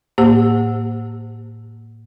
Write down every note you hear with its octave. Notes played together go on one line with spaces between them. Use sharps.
A2 A#3 G4 C5 F#5 E6